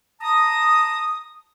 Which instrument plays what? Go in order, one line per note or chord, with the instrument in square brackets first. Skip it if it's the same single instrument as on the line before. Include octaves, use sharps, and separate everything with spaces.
[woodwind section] A5 A#5 D#6